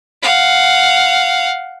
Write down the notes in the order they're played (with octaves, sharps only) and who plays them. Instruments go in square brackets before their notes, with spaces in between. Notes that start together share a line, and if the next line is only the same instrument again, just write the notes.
[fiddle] F5 F#5